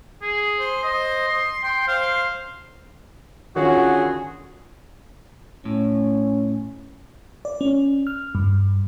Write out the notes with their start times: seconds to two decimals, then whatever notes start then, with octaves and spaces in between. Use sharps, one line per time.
0.22 G#4
0.59 C5
0.84 C5 D#5
1.28 C6
1.64 G5 C6
1.88 C5 F5
3.56 D3 D#3 C#4 F4 F#4 G#4
5.65 A2 C#4
7.45 D5
7.61 C#4
8.07 F6
8.35 G2